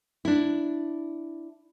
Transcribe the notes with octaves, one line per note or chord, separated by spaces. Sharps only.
D4 E4